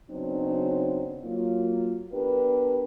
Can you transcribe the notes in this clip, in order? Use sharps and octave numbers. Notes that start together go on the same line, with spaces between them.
C#3 F#3 B3 C4 D4 D#4
F#3 A#3 F4
B3 D4 G4 A#4 B4